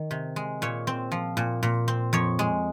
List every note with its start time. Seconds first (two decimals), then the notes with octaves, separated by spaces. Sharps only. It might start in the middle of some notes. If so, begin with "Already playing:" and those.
Already playing: D#3
0.11 C3
0.36 G#3
0.62 A#2 C#5
0.87 C4
1.12 F3
1.37 A#2
1.63 A#2
1.88 C4
2.13 F2 C#5
2.39 G#3